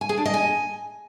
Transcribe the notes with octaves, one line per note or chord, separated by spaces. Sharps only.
G#5
G#4
D4
D#5
G#5